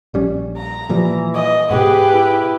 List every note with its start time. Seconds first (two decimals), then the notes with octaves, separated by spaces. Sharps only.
0.14 A#1 G3 C#4
0.57 A#5
0.89 A#2 E3 F3 G3
1.35 D#5
1.71 G#2 B2 G4 G#4 B4
2.14 E4